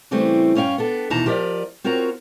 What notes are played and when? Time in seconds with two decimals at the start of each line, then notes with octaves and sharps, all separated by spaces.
0.11 C#3 E3 G3 A3 C4
0.55 G2 C#4 C#5 F5 G5
0.78 B3 D4 A4
1.10 D#2 B2 E3 D#4 A5 A#5
1.26 F3 G4 A#4 C5 D5 D#5
1.84 C4 F4 F#4 A#4 C#5 A#5